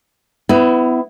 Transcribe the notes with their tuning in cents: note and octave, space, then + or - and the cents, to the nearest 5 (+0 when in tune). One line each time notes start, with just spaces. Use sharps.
B3 +30 E4 +0